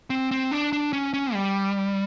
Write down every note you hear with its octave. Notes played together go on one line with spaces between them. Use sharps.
C4
C4
D4
D4
C#4
C#4
G3